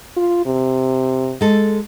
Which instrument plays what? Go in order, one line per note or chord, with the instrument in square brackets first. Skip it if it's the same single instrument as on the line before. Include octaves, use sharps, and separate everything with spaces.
[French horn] F4
C3
[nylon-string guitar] G#3 A4